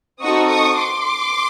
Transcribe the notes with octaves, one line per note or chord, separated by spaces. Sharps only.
C4 D#4 F#4 A4 C#6 D#6
C#6 D#6
C6 D6